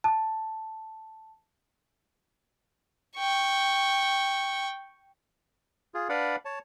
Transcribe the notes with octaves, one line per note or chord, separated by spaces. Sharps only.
A5
G5 C#6
F4 G#4
D4 B4 D5 F5 F#5 B5
C#5 A5